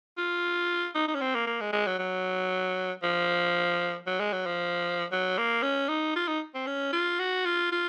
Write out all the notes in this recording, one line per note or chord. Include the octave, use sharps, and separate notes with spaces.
F4
D#4
D#4
C#4
C4
A#3
A#3
G#3
G#3
F#3
F#3
F3
F#3
G#3
F#3
F3
F#3
A#3
C#4
D#4
F4
D#4
C4
C#4
F4
F#4
F4
F4